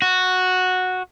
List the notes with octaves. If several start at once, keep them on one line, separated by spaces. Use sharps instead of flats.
F#4